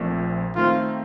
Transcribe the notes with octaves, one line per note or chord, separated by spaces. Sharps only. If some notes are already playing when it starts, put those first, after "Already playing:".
Already playing: A#1 A#2 A3 C4
D#3 A3 C4 F4